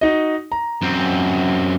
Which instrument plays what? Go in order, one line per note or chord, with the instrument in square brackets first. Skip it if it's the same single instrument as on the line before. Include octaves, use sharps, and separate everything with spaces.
[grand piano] D#4 F#4 D#5
A#5
[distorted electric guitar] F#2 C4